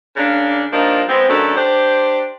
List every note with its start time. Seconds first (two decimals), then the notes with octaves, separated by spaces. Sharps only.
0.16 C#3 A#3 D4
0.72 F3 G3 A#3 D4 D#4
1.07 G#3 B3 C4
1.28 F#2 B2 A3 D4 A4
1.55 D4 G4 C5